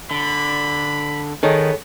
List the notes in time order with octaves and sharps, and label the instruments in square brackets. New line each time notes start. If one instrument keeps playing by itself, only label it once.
[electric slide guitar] D3 [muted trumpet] B5
[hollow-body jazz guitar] D#3 D#4 [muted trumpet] B3 [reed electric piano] G#4 A4 C#5